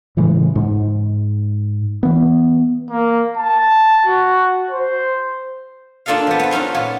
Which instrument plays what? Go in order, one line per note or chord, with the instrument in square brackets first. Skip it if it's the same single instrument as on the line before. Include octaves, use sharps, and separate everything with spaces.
[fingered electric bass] A2 C#3 E3 G#3
G#2
E3 B3
[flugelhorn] A#3
A5
F#4
C5
[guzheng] A#3 D4 F4 A4 D#5 F5
F3 B3
B3 C4
C4 C#4 D#4 F4 F#4
A#2 B3 F4 C#5